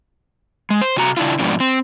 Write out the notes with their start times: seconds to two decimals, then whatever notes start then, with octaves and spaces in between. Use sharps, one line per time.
0.70 G#3
0.81 C5
0.96 C3 F#4 A#5
1.17 C#3 D4 E4 F4
1.39 G#2 B2 F3 D4
1.60 C4